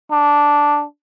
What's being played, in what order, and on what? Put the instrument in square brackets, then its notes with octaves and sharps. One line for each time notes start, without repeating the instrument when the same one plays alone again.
[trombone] D4